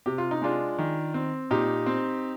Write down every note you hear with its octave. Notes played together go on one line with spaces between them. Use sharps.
C3 G4
F4
D#4
G#3 D4 F4
D#3
C4
A#2 D#4 G4
C4